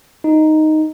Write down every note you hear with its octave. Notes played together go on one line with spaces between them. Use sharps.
D#4